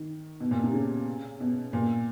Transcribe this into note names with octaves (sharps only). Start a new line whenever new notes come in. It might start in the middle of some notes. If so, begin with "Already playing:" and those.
Already playing: D#3
B2
A#2
C3
C#3
B2
A#2